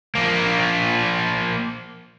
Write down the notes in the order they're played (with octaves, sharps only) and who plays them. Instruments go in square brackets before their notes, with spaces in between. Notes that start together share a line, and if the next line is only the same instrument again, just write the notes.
[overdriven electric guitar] F3 A#3